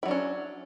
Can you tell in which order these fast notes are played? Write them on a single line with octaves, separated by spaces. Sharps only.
E4 F#3 D4 C#4